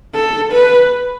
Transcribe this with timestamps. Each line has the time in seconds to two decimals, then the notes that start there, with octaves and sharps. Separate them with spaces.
0.15 A4
0.52 B4